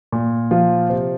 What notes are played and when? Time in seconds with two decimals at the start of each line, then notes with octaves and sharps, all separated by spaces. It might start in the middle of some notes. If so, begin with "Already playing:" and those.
0.12 A#2
0.51 F3 F4
0.89 C3 C5